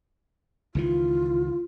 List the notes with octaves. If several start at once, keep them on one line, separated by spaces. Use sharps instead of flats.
C#2 D#3 E3 F4